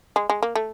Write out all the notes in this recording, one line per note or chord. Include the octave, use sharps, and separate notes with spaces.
G#3
G#3
A#3
A3